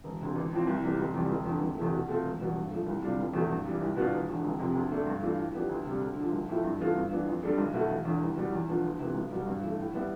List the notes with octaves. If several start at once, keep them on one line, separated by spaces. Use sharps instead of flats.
E1
D2 C3
A1
A2 F3 C4
C2
C3 E3 G3 B3
F1
E2 C3 G3
F1
E2 D3
F1
E2 C3 E3 A3
B2
A3 C4 F4 A4
E1
E2 B2 G3
G2
F3 A3
C2
C3 G3 D4 F4
F1
E2 B2 A3
G2
E3 G3
C2
B2 B3 D4 F4
E1
E2 D3
F1
F2 C3
D2
D3 A3 D4
G2
E3 A3 D4 F4
A2
F3 B3 D4 G4
D2
C3 G3
D2
D3
F3
B1
A2 F3 A3 E4
G2
E3 B3 F4 A4
G2
E3 B3 D4
F2
D3 G3 D4 A4
B1
B2 A3 E4 A4
E1
E2 D3
C2
B2 G3
E2
D3 F3 B3 F4
D2
C3 E3 B3
B1
B2 G3
G2
E3 A3
A2
G3 B3 E4